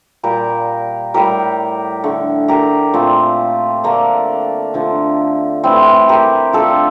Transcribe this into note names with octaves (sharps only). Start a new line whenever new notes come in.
A#2 G3 G4 A#4
A2 G3 G4 A#4
D3 A3
G4 A#4
A#2 F3 A3 C4
D3 A3 A#3 D4
D3 F3 A3
A2 E3 A3 C4 E4
G4 A#4
D3 A3 F4 A4